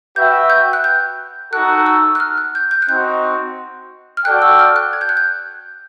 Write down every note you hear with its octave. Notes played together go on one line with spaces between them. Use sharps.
F#4 B4 E5 G5 G6
G6
F#6
G6
D#4 F#4 A4 F#6
E6
F#6
F6
F#6
G6
G6
F#6
C4 D#4 F#4 G6
F6
F#4 A4 D5 G5 F#6
E6
F6
F#6
G#6
G6
F#6
G6